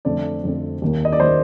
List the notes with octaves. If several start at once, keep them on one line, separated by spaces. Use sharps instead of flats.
F2 D3 A3 C4 D5
F2 D3 A3 C4
D#2 D#3 A#3
D#5
D5
D#3 A#3 C5